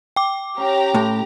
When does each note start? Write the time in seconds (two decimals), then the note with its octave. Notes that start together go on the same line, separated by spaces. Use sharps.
0.16 G5 D6
0.58 C#4 F#4 G4 A#5
0.94 A2